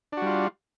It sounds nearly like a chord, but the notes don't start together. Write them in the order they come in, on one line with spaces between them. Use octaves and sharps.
D4 F#4 G3 F4